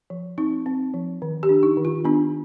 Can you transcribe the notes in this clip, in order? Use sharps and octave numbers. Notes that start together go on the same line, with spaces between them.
F3
C4 D#4
C4
F3
D#3
G4
D4
D#4
D#3
F4
B3 D4